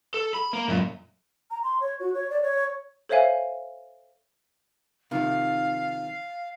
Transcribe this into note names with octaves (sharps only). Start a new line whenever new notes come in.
A4
B5
A#3
F#2 A#2
A#5
C6
C#5
F#4
C#5
D5
C#5
A4 C5 C#5 E5 F5 G#5
C3 D#3 F3 F5